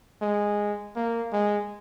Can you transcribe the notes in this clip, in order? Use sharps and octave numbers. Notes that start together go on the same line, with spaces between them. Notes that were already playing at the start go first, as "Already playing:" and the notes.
G#3
A#3
G#3